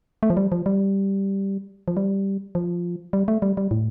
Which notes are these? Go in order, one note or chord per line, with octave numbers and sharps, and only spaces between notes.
A3
F3
G3
F3
G3
F3
G3
F3
G3
A3
G3
G3
A2